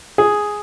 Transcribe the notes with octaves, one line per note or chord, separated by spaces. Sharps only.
G#4